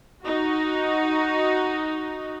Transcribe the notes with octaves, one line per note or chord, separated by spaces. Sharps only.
D#4 F#4